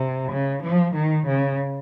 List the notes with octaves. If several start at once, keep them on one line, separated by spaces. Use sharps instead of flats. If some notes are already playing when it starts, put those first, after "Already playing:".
Already playing: C3
C#3
F3
D#3
C#3